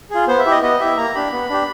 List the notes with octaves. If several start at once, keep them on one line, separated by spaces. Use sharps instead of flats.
F4 G#4
B3 C5
E5
E4 G4
D#5
B3 D#5
E4 G4 E5
A#3 A#5
D4 G4 B5
B3
D4 G4